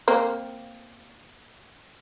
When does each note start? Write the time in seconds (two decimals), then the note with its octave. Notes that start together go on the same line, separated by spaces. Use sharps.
0.08 A#3 C4